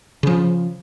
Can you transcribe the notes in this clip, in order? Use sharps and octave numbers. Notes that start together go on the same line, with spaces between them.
C#3 F3